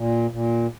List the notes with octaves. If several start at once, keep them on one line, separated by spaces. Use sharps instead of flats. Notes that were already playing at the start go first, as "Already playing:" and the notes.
Already playing: A#2
A#2